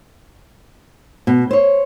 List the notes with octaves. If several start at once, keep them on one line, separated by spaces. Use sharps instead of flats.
B2
C5 C#5